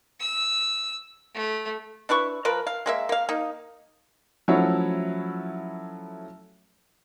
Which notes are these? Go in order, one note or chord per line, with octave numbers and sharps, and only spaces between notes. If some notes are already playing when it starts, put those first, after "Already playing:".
E6
A3
D4 E4 B4 C#6
F3 A#4 B4
F5
G#3 A#3 E5
A#3 F5
A#3 D#4
F3 F#3 A3 C#4 E4 C#5